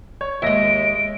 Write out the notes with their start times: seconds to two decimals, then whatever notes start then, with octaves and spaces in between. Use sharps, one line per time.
0.21 C#5
0.42 D#2 G#3 D#5 E5 A#6 D7